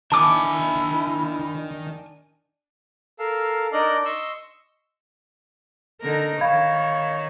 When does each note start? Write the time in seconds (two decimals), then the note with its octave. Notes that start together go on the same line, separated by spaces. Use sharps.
0.12 D#3 D4 E4 G#5 A5 D6
3.19 A4 A#4 F5
3.72 D4 D#4 A#4 D5 D#5
4.05 D#5 C6 C#6 E6
6.01 D3 D#4 A#4
6.41 D#3 C#5 F5 B5 G#6